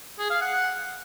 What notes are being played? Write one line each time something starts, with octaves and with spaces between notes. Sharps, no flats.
G#4
F5
F#5